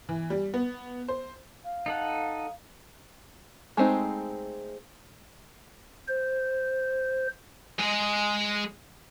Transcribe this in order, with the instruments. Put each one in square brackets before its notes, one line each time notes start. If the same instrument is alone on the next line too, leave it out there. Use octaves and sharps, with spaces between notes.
[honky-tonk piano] E3
G3
B3
C5
[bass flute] F5
[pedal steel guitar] D#4 A4 F#5
[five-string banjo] G#3 A3 C4 D#4
[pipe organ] C5
[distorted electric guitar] G#3 D#5